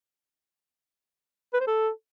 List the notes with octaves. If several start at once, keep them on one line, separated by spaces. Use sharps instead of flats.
B4
C5
A4